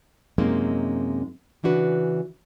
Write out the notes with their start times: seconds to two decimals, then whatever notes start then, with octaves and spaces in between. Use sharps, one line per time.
0.38 F#2 C3 G#3 A#3 C4 D#4
1.63 C#3 E3 D4 F#4 B4